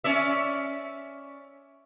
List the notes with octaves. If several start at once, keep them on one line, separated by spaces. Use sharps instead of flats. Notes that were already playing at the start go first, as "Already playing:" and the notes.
C#4 D5 E5